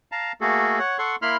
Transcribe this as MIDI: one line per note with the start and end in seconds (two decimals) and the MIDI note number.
0.12 0.32 77
0.12 0.32 81
0.12 0.32 82
0.41 0.79 57
0.41 0.79 58
0.41 0.79 66
0.41 0.79 68
0.41 0.79 69
0.79 0.98 73
0.79 0.98 78
0.99 1.16 69
0.99 1.16 78
0.99 1.16 84
0.99 1.16 85
1.22 1.37 58
1.22 1.37 64
1.22 1.37 83
1.22 1.37 84
1.22 1.37 89